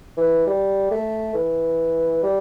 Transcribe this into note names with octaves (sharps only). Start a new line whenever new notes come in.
E3
G3
A3
E3
G3